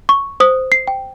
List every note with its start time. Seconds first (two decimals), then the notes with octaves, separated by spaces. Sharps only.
0.09 C#6
0.40 C5 D#6
0.72 C7
0.88 G5